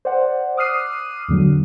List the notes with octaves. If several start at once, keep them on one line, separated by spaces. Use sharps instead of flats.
C5 D5 F#5
D6 D#6 F6 F#6 C7 D#7
E2 D3 F#3